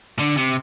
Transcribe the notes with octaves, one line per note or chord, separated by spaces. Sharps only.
D3
C3